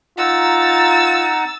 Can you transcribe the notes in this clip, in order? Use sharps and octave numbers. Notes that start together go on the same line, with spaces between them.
D#4 F4 F#5 A#5 E6 A6